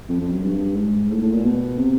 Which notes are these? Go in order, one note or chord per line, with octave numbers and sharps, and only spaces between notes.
F2
F2
F#2
G2
G#2
A2
A2
A#2
B2
C3